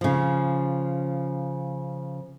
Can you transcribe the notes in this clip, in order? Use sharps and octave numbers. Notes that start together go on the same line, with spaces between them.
C#3 F3